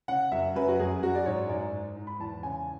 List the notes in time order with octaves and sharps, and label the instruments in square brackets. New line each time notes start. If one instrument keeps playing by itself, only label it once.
[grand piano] C#3 F#5
F#2 E5
F#2 B4
F#4
F#2 G#4
F#2 F#4
D5
G#2 C#5
G#2 D5
G#2
G#2
B5
E2 A5
C#3 G#5